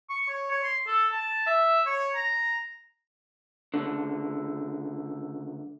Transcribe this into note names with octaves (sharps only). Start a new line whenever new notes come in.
C#6
C#5
C#5
C6
A4
A5
E5
C#5
A#5
C#2 D3